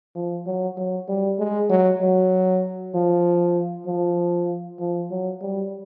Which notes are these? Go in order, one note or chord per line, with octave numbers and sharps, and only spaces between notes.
F3
F#3
F#3
G3
G#3
F#3
F#3
F3
F3
F3
F#3
G3